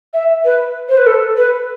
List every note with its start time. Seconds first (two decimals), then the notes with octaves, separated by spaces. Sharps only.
0.14 E5
0.45 B4
0.89 C5
0.97 B4
1.06 A4
1.37 B4